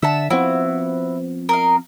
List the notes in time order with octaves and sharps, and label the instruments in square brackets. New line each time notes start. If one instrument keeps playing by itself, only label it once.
[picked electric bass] D3 [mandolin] E5 F#5 A5
[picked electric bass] F3 B3 C4 [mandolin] E4 F#4
[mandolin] A#4 D#5 F5